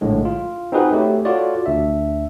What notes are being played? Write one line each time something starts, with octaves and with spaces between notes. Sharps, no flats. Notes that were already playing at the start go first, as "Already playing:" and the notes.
A#1 A2 D3 G#3
F4
C4 D#4 F#4 G#4 B4 F#5
A3 G4 C#5
F4 F#4 A4 C#5 D5
D2 D4 E5